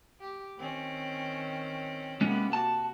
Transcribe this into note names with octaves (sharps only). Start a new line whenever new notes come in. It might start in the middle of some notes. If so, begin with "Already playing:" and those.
G4
D#3 C4 C#4
C3 G#3 A#3 B3 C#4
F#4 A5